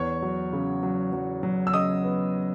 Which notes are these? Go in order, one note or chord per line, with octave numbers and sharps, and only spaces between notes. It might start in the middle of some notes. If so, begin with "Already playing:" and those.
Already playing: E2 C#5 C#6
F#3
C#3
F#3
F#3
F#3
E6
C#3 D#5 D#6
B3